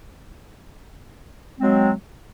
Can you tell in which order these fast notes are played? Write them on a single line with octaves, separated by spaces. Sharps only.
C4 G#3 F#3